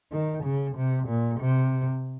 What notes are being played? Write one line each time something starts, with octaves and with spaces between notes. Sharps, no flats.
D#3
C#3
C3
A#2
C3